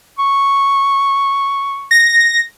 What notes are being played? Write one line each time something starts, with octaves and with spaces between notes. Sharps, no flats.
C#6
A#6